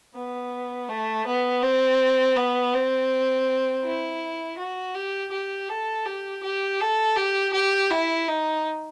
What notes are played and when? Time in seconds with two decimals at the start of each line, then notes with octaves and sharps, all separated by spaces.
0.15 B3
0.88 A3
1.26 B3
1.62 C4
2.36 B3
2.73 C4
3.84 E4
4.58 F#4
4.94 G4
5.31 G4
5.69 A4
6.05 G4
6.43 G4
6.80 A4
7.16 G4
7.53 G4
7.91 E4
8.28 D#4